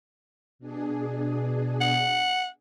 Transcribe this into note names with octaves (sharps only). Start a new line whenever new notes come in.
B2 D4 G#4
F#5